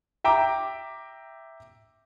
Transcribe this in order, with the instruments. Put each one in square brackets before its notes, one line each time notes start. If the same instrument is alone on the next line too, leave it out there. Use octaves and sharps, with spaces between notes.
[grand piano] E5 G5 A#5 D6